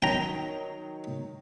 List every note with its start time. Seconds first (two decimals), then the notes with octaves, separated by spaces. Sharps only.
0.02 D#3 F#3 G5 A#5